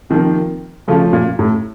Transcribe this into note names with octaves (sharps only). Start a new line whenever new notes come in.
C3 D#3 F3 A#3
C#3 F3 A3 C#4 F4
A#2
A2